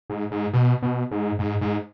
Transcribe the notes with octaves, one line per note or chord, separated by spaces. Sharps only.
G#2
G#2
B2
B2
G#2
G#2
G#2